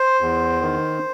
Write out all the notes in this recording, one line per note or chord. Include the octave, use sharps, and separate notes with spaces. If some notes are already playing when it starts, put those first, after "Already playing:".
Already playing: C5
E2
D#3